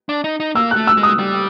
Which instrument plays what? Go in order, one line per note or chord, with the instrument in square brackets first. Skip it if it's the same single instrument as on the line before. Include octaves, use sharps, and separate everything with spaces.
[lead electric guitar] D4
D#4
D#4
[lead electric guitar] A#3 [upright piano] E6
[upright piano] F#6
[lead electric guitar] A3
[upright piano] E6
[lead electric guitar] G#3
[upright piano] D#6
[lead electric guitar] G3